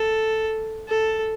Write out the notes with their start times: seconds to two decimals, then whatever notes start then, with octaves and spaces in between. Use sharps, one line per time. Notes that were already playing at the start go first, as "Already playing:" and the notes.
Already playing: A4
0.88 A4